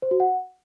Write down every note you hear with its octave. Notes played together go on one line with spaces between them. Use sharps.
C5
F#4
F#5